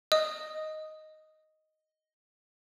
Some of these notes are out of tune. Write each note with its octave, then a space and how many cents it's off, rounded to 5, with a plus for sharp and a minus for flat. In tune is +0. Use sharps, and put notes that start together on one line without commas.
D#5 +0 D#6 +0